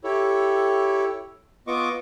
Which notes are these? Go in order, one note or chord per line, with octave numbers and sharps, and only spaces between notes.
E4 G4 A4 C#5
B3 F4 D#5 C#6 D6